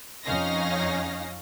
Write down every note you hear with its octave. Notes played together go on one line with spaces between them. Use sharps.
F2 C#4 D#4 F5 A#6